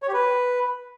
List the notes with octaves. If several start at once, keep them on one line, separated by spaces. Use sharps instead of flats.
C#5
G4
B4